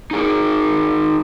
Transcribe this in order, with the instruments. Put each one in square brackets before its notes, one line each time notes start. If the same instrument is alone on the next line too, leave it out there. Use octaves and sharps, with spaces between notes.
[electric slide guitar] D#4 G#4 A#4